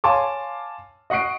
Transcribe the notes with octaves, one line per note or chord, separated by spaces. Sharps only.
C#5 F5 G#5 A5 C6 D6
D#5 F#5 C#6 C7 D7